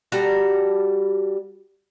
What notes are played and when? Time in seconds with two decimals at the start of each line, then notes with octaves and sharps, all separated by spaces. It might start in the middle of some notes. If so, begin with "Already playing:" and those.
0.12 G3 F#4 A4 A#5